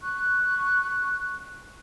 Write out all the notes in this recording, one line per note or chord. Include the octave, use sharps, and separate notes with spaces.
C#6 F#6